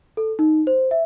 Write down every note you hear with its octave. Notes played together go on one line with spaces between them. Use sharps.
A4
D#4
C5
E5